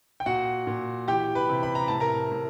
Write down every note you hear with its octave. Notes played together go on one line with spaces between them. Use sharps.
G5
A#2 F#4 F#5
A#2
E3 G4 G5
B4 B5
C3
B5
A#5
A2 A5
A#4 A#5
A2